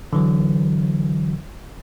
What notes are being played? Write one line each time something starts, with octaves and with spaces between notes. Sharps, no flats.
D3 E3 F#3